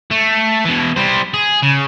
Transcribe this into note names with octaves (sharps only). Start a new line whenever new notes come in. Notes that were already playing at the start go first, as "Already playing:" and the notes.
A3
B2 E3
G3 C5
G#4
C#3